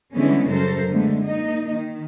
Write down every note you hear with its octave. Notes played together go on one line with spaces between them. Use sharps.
D3 E3 G3 G#3 B3 C#4
F#2 C#3 A4 A#4 C5
D3 G#3 A3 B3
A#3 D#4 D#5
D#3